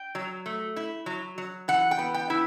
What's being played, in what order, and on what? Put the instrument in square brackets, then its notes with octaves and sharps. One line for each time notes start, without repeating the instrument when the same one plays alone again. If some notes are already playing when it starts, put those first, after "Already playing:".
Already playing: [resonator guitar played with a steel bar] G5
F#3
A3
E4
F#3
F#3
E3 F#5
G5
B3
G5
E4